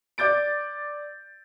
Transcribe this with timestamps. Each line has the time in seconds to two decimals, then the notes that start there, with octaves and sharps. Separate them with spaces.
0.18 D5 D6 G6 A6 D7